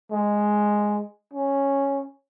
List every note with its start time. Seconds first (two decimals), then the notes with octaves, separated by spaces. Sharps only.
0.11 G#3
1.33 C#4